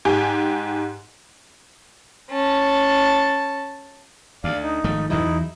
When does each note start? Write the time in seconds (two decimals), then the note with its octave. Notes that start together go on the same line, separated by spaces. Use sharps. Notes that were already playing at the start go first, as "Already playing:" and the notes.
0.05 G#2 G4 G#5
2.31 C#4 A5
4.44 D2 D5 F5
4.63 D#4
4.84 G#1 F3 A3
5.10 E2 E3 F#3 D#4 E4